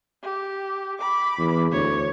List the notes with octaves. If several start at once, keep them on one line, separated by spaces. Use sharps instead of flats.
G4
B5 D6
E2
D2 C#5